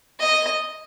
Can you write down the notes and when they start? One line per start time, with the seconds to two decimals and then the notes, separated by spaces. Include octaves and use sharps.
0.19 D#5